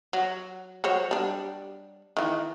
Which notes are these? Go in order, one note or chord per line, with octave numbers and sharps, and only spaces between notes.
F#3
F#3 C5 C#5
G3 D4
D#3 E3